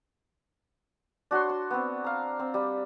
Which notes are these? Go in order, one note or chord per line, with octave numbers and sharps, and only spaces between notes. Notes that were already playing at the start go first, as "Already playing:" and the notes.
D4 F#4 C#5 C6
C6
B3 C4
F5 A#5
C4
G3